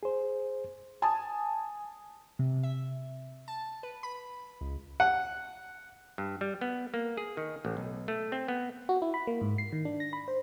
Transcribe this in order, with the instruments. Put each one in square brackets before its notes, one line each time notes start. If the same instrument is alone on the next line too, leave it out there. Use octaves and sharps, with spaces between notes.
[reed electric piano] G#4 C5
[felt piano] G#5 A5 D#6
[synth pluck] C3
E5
A5
B4
B5
C#2
[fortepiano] F#5
[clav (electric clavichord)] G2
G3
B3
A#3
G#4
D#3
A1
B1
A3
C4
B3
[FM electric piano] F#4
E4
B5
A#3
G#2
C7
D#3
D4
A#6
B5
C5